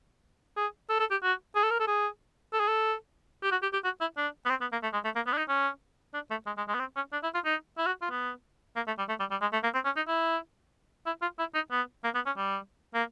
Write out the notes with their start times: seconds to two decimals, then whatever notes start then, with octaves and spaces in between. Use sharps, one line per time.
0.57 G#4
0.90 A4
1.00 A4
1.11 G4
1.23 F#4
1.56 G#4
1.63 A4
1.71 A#4
1.80 A4
1.87 G#4
2.53 A4
2.60 G#4
2.68 A4
3.43 G4
3.52 F#4
3.63 G4
3.73 G4
3.84 F#4
4.01 E4
4.17 D4
4.46 B3
4.50 C4
4.61 B3
4.72 A#3
4.83 A3
4.93 G#3
5.05 A3
5.16 A#3
5.27 B3
5.33 D4
5.38 D#4
5.48 C#4
6.14 D4
6.31 A3
6.46 G#3
6.58 G#3
6.68 G#3
6.74 B3
6.80 C4
6.96 C#4
7.13 D4
7.23 E4
7.35 F4
7.45 D#4
7.78 E4
7.86 F#4
8.02 F4
8.11 B3
8.76 A#3
8.87 A3
8.98 G3
9.09 A3
9.20 G3
9.31 G3
9.42 G#3
9.53 A3
9.64 A#3
9.74 C4
9.85 C#4
9.97 D#4
10.08 E4
11.06 E4
11.22 F4
11.39 E4
11.55 D#4
11.71 B3
12.04 A#3
12.15 B3
12.26 C#4
12.37 G3
12.94 A#3